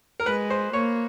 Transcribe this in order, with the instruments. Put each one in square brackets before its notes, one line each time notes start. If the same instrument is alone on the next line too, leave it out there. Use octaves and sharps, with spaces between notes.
[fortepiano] A#4
[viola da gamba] G#3 [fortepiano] B4
[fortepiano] C5
[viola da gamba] A#3 [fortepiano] C#5